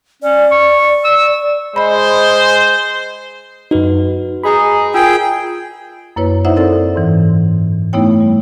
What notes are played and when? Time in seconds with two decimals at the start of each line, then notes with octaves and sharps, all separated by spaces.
0.22 C#4 D5
0.51 C#6
1.05 E6
1.76 G#3 C5 D#5 B5
3.71 F#2 D#4 F#4 B4
4.43 G#3 D#4 G#4 B5
4.94 F4 G#4 A#4 G5 E6
6.16 F#2 A#3 E4 B4 C#5
6.45 D#4 E4 C5 D5 E5 F#5
6.56 C4 D#4 E4 A4 A#4 D5
6.96 G#2 E3
7.93 A3 B3 D#4 E4 C#5 G5
8.20 G3